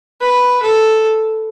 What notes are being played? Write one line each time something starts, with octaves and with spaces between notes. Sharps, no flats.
B4
A4